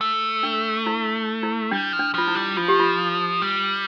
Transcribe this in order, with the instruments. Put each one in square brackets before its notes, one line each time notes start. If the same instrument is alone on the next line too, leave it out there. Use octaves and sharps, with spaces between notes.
[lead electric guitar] A3
[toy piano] D4
E4
E4
[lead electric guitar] G3 [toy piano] D4
[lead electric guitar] F3
[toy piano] D4
[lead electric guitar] F3 [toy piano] F4
[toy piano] E4
[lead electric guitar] G3
[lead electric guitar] F3 [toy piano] F4
[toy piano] G4
F4
[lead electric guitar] G3